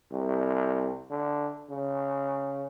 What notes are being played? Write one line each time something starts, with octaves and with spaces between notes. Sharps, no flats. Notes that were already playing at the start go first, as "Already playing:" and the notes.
C2
D3
C#3